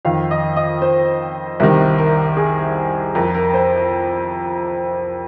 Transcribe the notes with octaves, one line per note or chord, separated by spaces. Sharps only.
F2 D#3 F5
D#5
D#5
C5
C2 C3 D#3 A#4
A#4
G#4
F2 F3 A#4
A#4
C5